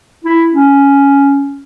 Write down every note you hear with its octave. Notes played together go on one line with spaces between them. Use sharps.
E4
C#4